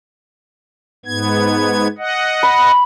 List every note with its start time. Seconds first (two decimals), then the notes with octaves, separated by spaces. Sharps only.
1.05 G#2 B3 G#6
1.98 D#5 F#5
2.43 B5